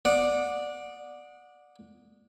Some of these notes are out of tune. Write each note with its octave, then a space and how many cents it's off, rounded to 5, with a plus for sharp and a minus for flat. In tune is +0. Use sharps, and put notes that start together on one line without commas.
D5 +5 F#5 -25 D#6 -10